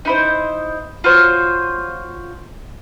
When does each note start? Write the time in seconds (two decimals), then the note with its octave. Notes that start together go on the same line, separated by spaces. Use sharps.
0.05 D#4 E4 C5
1.04 F4 F#4 C5 C#5